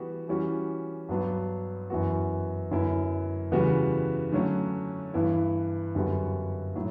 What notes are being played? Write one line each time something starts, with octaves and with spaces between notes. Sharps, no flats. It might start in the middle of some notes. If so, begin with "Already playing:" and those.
Already playing: E3 G3 B3 F#4
E3 G3 C#4 F#4
G2 F#3 B3 D4 F#4
F#2 E3 B3 F#4
F#2 D3 F#3 B3 E4
E2 C#3 G3 B3 F#4
D3 F#3 A3 C#4
G2 E3 B3 E4
F#2 D3 G3 B3 F#4
A2 F#3